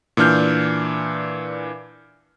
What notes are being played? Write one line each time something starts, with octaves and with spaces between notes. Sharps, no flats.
A#2 E3 D4 F6 G6